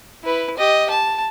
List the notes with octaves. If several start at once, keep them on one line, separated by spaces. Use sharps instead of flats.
E4 B4
G4 D#5
A5